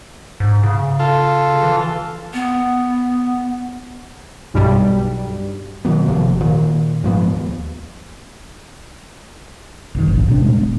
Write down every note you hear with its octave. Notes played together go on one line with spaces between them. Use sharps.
G#2
C#3
F4 A4
E3
B3
B1 G2 G3
B2 D#3 F#3 B3
F#1 D#2 C3 F3
A#2 D#3
G#2 F3 B3
D#2
F#1 A#2 D#3
E1 A#1 G#2
C3 D4
A#2 G3 G#3
D#1 B3